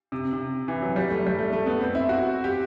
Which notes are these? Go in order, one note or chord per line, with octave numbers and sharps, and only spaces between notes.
C3
C3
E3
F#3
G3
A3
G3
A3
A3
B3
C4
E4
F#4
G4